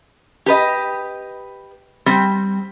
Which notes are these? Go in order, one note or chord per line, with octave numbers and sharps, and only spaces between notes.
G4 B4 D#5
G3 C4